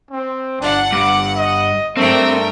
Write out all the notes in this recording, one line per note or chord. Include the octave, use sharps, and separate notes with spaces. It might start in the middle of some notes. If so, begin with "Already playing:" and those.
C4
G1 D4 F#5
G2 D6
D#5
G2 A3 C4 A#4 G5